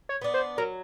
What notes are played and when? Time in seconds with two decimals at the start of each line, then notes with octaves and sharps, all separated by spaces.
0.09 C#5
0.22 B3 D4
0.34 C5
0.58 F#3 A#4